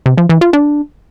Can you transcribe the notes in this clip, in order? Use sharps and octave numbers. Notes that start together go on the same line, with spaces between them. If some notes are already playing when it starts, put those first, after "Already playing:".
C3
F3
E3
F4
D4